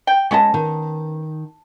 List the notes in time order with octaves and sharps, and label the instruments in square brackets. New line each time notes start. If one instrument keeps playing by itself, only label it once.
[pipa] G5
[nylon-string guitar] G#3 D#5 A5 [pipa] B3 C#4
[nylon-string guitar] D#3